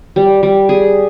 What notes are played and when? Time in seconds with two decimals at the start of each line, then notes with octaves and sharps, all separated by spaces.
0.16 G3
0.43 G3
0.69 G#4